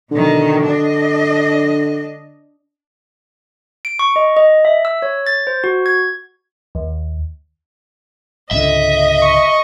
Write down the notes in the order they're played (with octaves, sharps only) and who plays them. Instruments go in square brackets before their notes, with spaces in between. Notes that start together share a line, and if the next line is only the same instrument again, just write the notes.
[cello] B2 D#3 [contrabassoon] D3
[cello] D4 D#5
[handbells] D7
C#6
D#5
D#5
E5
E6
C#5
A6
C5
F#4
G#6
[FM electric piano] D#2
[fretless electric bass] G#1 C#2 D3 [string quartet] D#5 [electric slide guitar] E5
[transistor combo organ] C#6